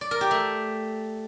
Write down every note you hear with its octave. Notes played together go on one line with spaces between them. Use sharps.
D5
A#4
G4
A3